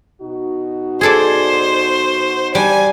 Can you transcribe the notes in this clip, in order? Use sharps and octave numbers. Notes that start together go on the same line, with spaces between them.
B2 D#4 F#4
G#4 A4 C5 D5
G3 D4 G#5